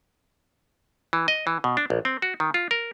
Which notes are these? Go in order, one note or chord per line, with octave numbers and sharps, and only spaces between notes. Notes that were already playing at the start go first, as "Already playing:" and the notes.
E3
D#5
E3
B2
D4
A#1
C4
F#4
D#3
F4
A#4